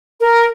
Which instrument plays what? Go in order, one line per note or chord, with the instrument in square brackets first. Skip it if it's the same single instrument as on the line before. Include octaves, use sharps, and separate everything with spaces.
[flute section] A#4